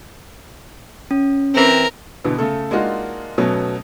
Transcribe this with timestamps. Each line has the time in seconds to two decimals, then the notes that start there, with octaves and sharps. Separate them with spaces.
1.11 C#4
1.54 E3 C4 A#4
2.24 B2 D3 E3 B3
2.38 C#3 A3 A4
2.71 G#3 A#3 D4 D#4 F4 F#4
3.38 B2 F#3 A3 B3 C#4